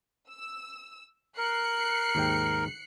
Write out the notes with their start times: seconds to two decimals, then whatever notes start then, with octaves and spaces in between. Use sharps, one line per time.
0.29 E6
1.38 A#4 F#6 C7 C#7
2.15 D#2 G#2 G5